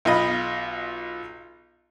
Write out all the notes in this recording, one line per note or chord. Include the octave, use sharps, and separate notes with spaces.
B1 F4 D#5 B5